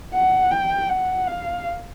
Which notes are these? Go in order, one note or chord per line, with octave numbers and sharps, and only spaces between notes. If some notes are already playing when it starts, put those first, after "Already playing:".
F#5
G5
F#5
F5